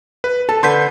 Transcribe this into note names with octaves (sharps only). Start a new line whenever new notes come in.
B4
A4 A5
D3 D4 B4 C6 G6 B6